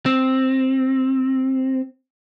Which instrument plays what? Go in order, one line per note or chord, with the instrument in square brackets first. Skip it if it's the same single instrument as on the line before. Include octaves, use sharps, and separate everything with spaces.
[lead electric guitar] C4